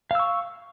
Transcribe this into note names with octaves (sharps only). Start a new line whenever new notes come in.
F5 C#6 E6